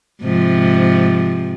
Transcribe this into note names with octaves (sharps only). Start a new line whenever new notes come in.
G#2 C3 F3